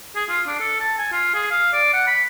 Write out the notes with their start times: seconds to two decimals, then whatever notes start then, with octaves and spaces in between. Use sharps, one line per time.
0.15 G#4
0.29 F4
0.47 D4
0.60 A4
0.80 A5
0.98 G#5
1.12 F4
1.34 G#4
1.51 F5
1.73 D5
1.93 F#5
2.07 B5